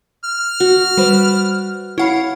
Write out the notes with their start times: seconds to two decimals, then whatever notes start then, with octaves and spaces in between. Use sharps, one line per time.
0.24 F6
0.60 F#4
0.97 G3 B4 C5 D5
1.98 E4 C#5 F5 F#5 B5